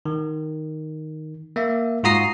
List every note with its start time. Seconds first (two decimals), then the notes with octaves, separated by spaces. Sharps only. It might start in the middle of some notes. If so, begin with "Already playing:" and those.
0.06 D#3
1.56 A#3 E5
2.03 G#2 F4 F#4 A#5 D#6 C7